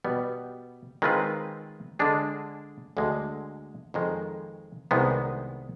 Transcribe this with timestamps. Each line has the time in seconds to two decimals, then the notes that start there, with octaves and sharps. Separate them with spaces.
0.04 B2 G3 B3
1.02 D#3 G#3 C4 F4 B4
1.99 D3 G#3 D4 G#4
2.97 D2 D3 G#3
3.94 F2 D#3 G#3
4.91 C2 C3 D#3 G#3 B3